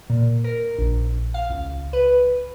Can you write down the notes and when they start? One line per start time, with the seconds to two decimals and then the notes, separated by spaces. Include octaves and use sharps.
0.10 A#2
0.44 A#4
0.78 A#1
1.34 F5
1.50 C#2
1.93 B4